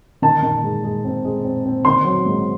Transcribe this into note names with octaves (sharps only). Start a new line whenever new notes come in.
D#3 A5
D#3
G#3
G#3
C4
G#3
C4
C4
D#3 C6
F#3
G#2